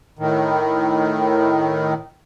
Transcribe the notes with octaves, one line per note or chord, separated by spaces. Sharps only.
A2 D#3